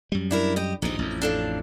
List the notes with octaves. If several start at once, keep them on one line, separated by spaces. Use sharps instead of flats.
F#2 G3
D4 E4 A#4
G4 D#5
A#1 D#2 G#2 D#4 D#5
A1 F2
D4 A4 F5